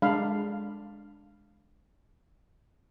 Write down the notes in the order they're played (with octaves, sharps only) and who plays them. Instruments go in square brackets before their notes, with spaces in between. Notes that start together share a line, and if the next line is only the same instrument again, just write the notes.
[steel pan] G#3 D4 F5 B5